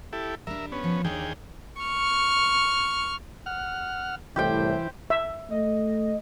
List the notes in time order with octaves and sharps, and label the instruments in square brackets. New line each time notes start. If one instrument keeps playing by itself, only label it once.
[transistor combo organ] E4 G4 A4
[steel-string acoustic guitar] G3 D4 [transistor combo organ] A#4 E5
[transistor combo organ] B3 C#4
[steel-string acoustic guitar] F3
[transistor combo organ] D#2 G#4 G5 [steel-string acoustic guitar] D4 C#5
[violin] C#6 F6
[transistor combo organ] F#5 F6
[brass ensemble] C2 A2 [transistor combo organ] E3 [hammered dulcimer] G4 C5 G5
[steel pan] E5
[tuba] A3 [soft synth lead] D#5